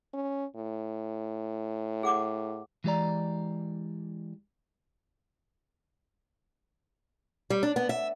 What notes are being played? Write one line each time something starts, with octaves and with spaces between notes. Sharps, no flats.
C#4
A2
G#4 F#5 D6
E3 G#3 G4 G#4 D5 A#5
G3
D4
B3
E5